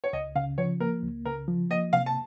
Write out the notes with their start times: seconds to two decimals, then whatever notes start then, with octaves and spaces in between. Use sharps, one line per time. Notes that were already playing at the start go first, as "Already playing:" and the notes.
0.04 C#5
0.13 C#2 D#5
0.36 C#3 F5
0.58 F3 C#5
0.80 A#3 A#4
1.03 C#2
1.25 C#3 A#4
1.48 F3
1.70 A#3 D#5
1.93 C3 F5
2.06 A5